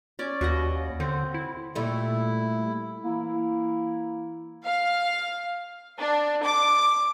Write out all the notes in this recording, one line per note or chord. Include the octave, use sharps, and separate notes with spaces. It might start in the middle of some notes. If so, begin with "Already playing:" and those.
C#4 D5
D#2 F#4 B4 D#5
D3 C4
E4
A#2 G3 A3 E4
E3 A#3 E4
F5
D4
D6